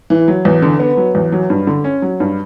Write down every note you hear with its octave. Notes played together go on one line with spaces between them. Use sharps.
E3
F#3
E2
D3
B3
F#3
E2
F#3
G2
D3
C#4
F#3
G2